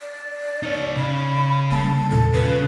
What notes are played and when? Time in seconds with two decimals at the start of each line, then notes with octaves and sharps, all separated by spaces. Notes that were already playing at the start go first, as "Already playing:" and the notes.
0.01 D5
0.63 D#4 C#5
0.97 C#3 B5
1.71 G3 A#3 A5
2.10 E2 A#2 A4
2.34 C#3 B4